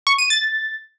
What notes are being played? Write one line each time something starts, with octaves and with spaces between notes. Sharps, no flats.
C#6
D#7
A6